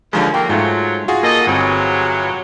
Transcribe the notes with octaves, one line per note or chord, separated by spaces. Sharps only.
D#2 D3 F3 G#3
F#3 A3 A#3 G5
G#2 F3 F#3 A3 F4
F4 F#4 G#4
G2 A#3 A4 D#5
G1 C3 E3 F#3 C4